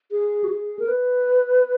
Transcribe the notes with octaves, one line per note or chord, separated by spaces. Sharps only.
G#4
F#4
G#4
A#4
B4